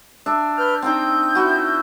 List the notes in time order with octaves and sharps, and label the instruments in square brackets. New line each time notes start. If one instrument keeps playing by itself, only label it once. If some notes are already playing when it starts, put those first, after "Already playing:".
[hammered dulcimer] D4 E5
[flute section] B4 F6 G6
[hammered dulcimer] C4 G5 A#5 [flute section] D#4 G6
[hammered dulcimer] E4 F#4